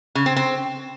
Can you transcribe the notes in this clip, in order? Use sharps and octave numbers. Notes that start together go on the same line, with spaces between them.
C#3
C4
C4